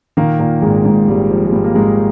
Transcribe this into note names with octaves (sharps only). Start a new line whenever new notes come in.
A#2 D#3 A#3
A#2 A#3
G#1 G#2 G#3
G#2 G#3
G#1 G3
F3
G#3
G#2 G3
A#3
G#2 G#3